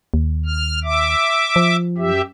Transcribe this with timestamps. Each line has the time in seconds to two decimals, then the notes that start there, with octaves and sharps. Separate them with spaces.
0.14 D#2
0.46 F6
0.84 E5 D6
1.56 F3
1.98 F#2 G4 E5